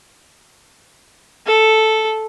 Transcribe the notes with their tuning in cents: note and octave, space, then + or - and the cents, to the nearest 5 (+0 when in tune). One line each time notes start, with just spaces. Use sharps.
A4 -5